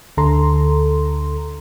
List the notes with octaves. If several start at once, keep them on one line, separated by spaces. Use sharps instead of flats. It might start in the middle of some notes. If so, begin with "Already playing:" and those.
D2 D3 A4 A#5 C6